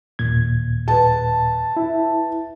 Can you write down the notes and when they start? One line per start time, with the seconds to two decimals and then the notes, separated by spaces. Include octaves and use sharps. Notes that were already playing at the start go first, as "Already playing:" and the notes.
0.19 D#2 A#2 G#6
0.88 B4 A5
1.77 E4